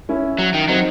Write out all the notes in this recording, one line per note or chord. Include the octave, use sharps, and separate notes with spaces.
C#4 E4
F#3
D#3
F#3 C4 D#4